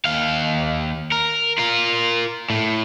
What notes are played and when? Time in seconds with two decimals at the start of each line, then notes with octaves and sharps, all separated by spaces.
0.05 D#2 F5
1.12 A#4
1.58 F4 A#4
2.50 A2